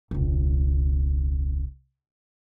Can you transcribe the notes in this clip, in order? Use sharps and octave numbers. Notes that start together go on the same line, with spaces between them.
E1 C#2